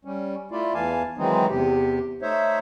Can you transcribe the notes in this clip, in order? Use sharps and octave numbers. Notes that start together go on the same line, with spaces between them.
G3 C#4
A3 E4 F4 D5
E2 E3 F5 G#5 A5
D#3 E3 F#3 G#3 C4 D#4
E2 C3 G4
A3 D#4 C5 C#5 E5